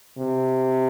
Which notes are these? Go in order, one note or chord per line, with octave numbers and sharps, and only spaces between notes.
C3